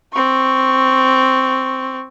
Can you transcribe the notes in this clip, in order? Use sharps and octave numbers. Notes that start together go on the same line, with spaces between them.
C4 C#6